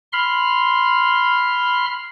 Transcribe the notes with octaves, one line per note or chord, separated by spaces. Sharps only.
B5 C6 F6